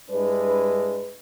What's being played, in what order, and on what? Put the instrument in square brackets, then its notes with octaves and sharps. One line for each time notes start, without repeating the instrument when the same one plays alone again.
[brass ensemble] G2 G#3 D4 E4 B4